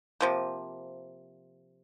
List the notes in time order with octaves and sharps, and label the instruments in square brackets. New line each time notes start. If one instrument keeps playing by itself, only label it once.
[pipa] C3 F3 A#3